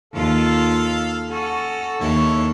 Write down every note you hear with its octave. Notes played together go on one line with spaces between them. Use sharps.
D#2 F4 A4 F5
C#4 F#4 A4
D#2 E4 A4 C#5